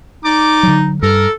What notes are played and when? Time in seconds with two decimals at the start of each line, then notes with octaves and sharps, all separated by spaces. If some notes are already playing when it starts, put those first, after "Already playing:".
0.25 D#4 D5 D6
0.63 D3 F#3
1.03 G2 A4 A#4